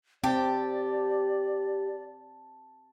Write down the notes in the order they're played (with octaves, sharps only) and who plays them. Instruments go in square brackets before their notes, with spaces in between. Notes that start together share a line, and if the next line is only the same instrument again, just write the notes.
[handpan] C4 [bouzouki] G4 [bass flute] D5 [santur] A5